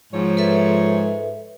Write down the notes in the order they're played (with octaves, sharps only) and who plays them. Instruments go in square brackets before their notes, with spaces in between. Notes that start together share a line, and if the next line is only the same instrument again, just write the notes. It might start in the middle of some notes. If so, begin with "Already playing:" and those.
[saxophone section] G#2 F3 C#5
[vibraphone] A4 B4 E5